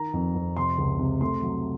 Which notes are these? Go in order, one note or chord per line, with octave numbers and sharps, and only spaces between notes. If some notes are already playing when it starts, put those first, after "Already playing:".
Already playing: D#3 A#5
F2
F2
C3 C6
C#2
C3
A3 C6
F#3